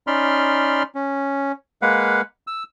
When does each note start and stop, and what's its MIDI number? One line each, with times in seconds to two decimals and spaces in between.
0.07 0.83 61
0.07 0.83 63
0.07 0.83 74
0.07 0.83 83
0.07 0.83 84
0.07 0.83 89
0.95 1.52 61
1.82 2.21 56
1.82 2.21 58
1.82 2.21 71
1.82 2.21 77
1.82 2.21 78
2.47 2.63 88